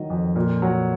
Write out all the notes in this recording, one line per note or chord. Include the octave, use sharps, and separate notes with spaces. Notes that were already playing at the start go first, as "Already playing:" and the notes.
Already playing: D#3 F#3 D#5
F2
A#2
F#3